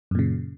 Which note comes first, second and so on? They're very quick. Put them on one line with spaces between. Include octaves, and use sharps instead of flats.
F#2 A#2 C#3